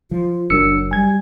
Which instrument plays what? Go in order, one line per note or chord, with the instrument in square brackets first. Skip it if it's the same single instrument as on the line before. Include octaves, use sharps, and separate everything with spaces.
[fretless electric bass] F3 [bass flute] F4
[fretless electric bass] F#1 F#3 [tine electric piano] D4 E6 C#7 [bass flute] A#4
[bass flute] G3 [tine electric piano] G#5 G#6